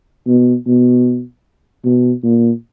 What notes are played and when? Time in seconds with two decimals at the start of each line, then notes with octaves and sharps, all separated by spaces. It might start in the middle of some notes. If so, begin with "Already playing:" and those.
0.27 B2
0.67 B2
1.85 B2
2.23 A#2